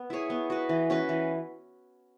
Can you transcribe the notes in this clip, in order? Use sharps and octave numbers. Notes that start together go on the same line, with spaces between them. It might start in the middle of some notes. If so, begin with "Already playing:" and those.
Already playing: B3
E4 G#4 C#5
B3
F#4 B4
E3
C#4 F#4 B4
E3